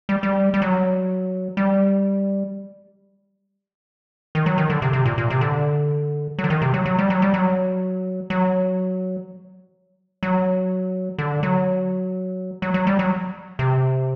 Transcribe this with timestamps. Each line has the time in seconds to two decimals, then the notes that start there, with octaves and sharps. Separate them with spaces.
0.09 G3
0.23 G3
0.54 G3
0.62 F#3
1.57 G3
4.35 D#3
4.46 F#3
4.58 D#3
4.70 D3
4.82 C3
4.93 C3
5.06 A#2
5.18 A#2
5.30 C3
5.41 D3
6.39 F#3
6.44 D3
6.50 D#3
6.62 C3
6.74 F#3
6.85 F#3
6.99 G3
7.10 F#3
7.22 G3
7.34 F#3
8.30 F#3
10.23 F#3
11.18 D3
11.43 F#3
12.62 F#3
12.74 F#3
12.87 G3
12.99 F#3
13.59 C3